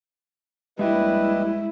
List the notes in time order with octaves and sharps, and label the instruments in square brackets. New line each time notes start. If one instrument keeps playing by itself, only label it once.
[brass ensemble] A#1 G3 [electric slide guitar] G#3 E5 [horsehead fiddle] E4 [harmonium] G4 B4 D#5